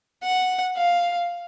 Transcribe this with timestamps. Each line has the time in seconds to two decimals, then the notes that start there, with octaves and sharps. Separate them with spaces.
0.23 F#5
0.76 F5